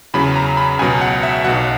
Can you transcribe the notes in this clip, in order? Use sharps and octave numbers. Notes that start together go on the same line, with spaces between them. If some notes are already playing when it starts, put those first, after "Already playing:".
E2 C#3 F#3 B5
A#5
B5
C#2 B2 F#3 G#5
F#5
E5
B1 B2 F#3 F#5